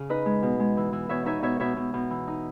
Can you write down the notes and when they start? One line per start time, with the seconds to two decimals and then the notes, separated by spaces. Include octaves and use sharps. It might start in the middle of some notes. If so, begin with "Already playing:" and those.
Already playing: C#3
0.09 D#4 B4 D#5
0.26 G#3
0.42 B2
0.60 G#3
0.77 E3
0.93 E3
1.09 B2 C#5 E5
1.26 D#4 C#5 E5
1.42 B2 C#5 E5
1.60 B2 C#5 E5
1.76 B2
1.94 B2
2.10 E3
2.27 D#4